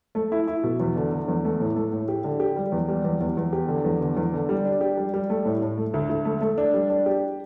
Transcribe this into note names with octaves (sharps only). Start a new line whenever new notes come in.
A3
E4
E4
B2
E2
D3
D3
E2
A3
A2
A3
A2
G4
D3
G4
G3
E2
G3
E2
E2
E2
G4
D3
E2
D3
E2
D3
G3
D4
G4
G3
G3
A3
A2
A2
A3
D2
D2
A3
A3
D4
G3
D4
G4